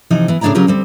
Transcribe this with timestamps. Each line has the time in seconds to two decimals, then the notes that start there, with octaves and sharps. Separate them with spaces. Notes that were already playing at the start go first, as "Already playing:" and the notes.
0.10 C3 E3 F3 D#4
0.28 E3 B3
0.41 A2 C#3 D4 C#5 D5 A#5
0.55 C#3 F#3 C#4 F4 G4 A#4
0.67 D2 G3 C4